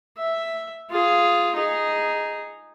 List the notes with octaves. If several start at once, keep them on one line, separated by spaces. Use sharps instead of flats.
E5
F4 G#4
D#4 G#4